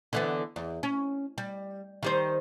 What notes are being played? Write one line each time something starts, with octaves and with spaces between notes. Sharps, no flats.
D3 E3 B3
E2
C#4
G3
D#3 G3 C5